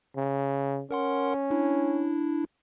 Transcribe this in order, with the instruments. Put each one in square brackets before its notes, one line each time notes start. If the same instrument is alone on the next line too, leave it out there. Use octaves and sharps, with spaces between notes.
[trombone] C#3
[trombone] C#4 [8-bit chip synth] A#4 F#5 C6
[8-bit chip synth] D4 E4